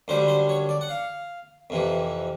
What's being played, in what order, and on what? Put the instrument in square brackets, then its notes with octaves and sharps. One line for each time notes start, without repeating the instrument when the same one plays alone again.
[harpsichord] F#2 D3 G3 C5
C5
C#5
D5
F#5
F5
F2 C3 E3